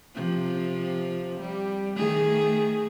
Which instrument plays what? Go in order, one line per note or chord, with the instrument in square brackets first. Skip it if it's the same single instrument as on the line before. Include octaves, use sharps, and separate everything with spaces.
[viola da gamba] C3 F3
G3
D#3 A3 G#4